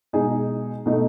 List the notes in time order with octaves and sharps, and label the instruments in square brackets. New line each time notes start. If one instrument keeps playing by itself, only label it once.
[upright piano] B2 G#3 D#4 G#4 D#5
B2 A3 D#4